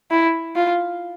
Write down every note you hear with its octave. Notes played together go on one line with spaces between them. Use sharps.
E4
F4